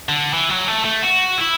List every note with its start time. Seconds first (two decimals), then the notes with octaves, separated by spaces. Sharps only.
0.09 D3
0.33 E3
0.49 F#3
0.68 A3
0.85 A3
1.03 F#4
1.38 E4